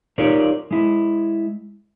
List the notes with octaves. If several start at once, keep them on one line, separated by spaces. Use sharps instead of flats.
D#4 F4 G4 A#4 C#5 D5
G#3 E4